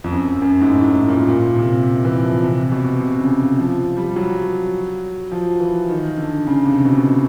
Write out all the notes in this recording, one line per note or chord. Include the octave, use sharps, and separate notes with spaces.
F2
F#2
F#2
G#2
A2
A2
A#2
A#2
C3
E3
F3
C3
B2
C3
C#3
F3
G3
F#3
F3
E3
D#3
D3
C#3
C3
B2